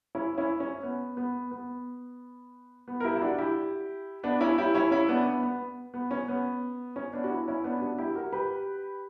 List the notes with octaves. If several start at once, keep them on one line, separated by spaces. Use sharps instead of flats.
C#4 E4
C#4 E4
C#4
B3
B3
B3
B3
A#4
E4 G4
E4
D4 F#4
E4 G4
B3 D4
C#4 E4
E4 G4
C#4 E4
C#4 E4
B3 D4
B3
B3
B3
C#4
B3
C#4
B3 D4
F#4
C#4 E4
C#4 E4
B3 D4
D4 F#4
E4 G4
F#4 A#4
G4 B4